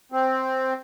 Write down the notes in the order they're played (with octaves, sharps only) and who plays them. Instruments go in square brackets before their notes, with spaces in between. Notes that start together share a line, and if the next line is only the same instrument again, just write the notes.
[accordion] C4